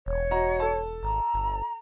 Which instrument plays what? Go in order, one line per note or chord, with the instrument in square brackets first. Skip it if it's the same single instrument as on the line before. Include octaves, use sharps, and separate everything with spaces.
[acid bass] E1 [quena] C#5
[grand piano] F#4 D#5 A#5
A4 A5
[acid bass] G#1 [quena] A#5
[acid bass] G1